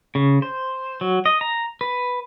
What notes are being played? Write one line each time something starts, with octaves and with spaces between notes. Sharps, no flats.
C#3
C5
F#3
D#5
A#5
B4